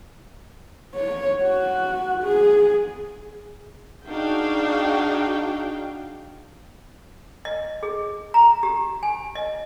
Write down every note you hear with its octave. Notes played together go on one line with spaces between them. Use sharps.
C#5
F#4
G#4
D4 D#4 F#4 G#4 F5 G5
D#5
G#4
A#5
G4
G#5
D#5